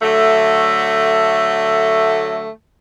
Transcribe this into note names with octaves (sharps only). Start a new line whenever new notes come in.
D3 F#3 A3